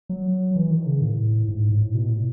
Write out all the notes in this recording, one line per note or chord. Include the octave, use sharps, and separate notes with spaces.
F#3
E3
D#3
C#3
A2
G#2
A2
B2
A2